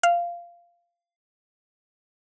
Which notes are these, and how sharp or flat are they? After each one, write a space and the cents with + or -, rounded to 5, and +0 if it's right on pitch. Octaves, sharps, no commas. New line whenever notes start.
F5 -10